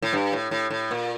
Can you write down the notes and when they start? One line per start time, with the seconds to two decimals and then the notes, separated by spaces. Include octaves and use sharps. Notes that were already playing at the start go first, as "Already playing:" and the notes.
0.02 A2
0.13 G2
0.33 A2
0.51 A2
0.70 A2
0.91 A#2